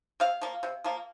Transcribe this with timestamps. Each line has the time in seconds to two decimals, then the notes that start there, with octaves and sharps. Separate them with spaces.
0.20 C3 F5
0.41 F3 A#3
0.63 C3
0.84 F3 A#3